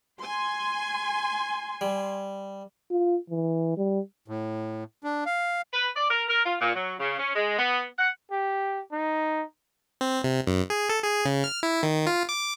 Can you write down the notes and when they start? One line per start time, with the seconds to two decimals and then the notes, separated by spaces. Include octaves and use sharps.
0.20 G#5 C6
1.81 G3
2.91 F4
3.30 E3
3.77 G3
4.28 A2
5.04 D4
5.26 F5
5.73 B4
5.96 D5
6.11 A#4
6.29 A#4
6.46 F4
6.61 A#2
6.76 F#3
7.00 C#3
7.19 C#4
7.36 G#3
7.59 B3
7.99 F#5
8.31 G4
8.92 D#4
10.01 C4
10.24 C3
10.47 F#2
10.70 G#4
10.90 A4
11.04 G#4
11.25 C#3
11.44 F6
11.63 E4
11.83 D#3
12.07 F4
12.29 D6